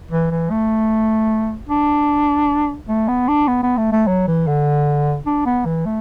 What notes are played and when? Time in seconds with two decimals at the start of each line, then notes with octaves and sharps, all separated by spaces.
0.11 E3
0.31 E3
0.51 A3
1.69 D4
2.88 A3
3.08 B3
3.28 D4
3.48 B3
3.63 B3
3.77 A3
3.92 A3
4.07 F#3
4.27 E3
4.47 D3
5.26 D4
5.46 B3
5.65 E3
5.86 A3